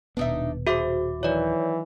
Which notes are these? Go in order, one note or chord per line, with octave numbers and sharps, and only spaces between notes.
D#1 B2 B3 D4 D#4 E5
F#4 G#4 C5 E5 D6
D#3 E3 F#3 C#5 D5